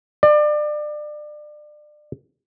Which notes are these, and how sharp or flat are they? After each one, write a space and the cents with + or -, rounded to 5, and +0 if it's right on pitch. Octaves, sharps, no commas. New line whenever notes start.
D5 +30